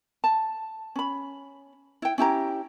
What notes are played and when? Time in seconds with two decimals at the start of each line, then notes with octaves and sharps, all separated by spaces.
0.24 A5
0.96 C#4 B5
2.02 E4 G5
2.18 C#4 E4 G4 A#5